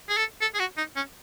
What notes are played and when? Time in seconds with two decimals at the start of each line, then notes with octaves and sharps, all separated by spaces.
0.09 G#4
0.17 A4
0.41 A4
0.54 G#4
0.59 F#4
0.77 D#4
0.96 C#4